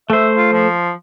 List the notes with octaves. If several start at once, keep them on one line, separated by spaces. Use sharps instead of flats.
A3 C5 E5
F4
F3